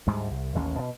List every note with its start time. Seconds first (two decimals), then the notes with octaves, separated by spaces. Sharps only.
0.07 D2 G#2 G3 G#3
0.31 C2
0.55 A1 D#2 C#4
0.78 B2